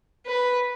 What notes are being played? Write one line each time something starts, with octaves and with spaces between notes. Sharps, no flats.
B4